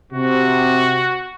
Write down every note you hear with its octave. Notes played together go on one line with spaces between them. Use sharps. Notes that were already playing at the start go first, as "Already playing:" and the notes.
C3 F#4